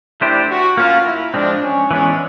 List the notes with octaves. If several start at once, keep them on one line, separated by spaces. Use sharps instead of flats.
A3 D4 E4 G4 C5
F#4
A#3 C#4 F4 F#4 A#4
E4
F3 G#3 C4 D4
C#4
E3 G#3 B3 C#4 D4